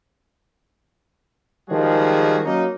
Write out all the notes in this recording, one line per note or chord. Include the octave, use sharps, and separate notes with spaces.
D#3 F3 G3 G#3 F#4 G#4
F#3 A#3 C#4 D#4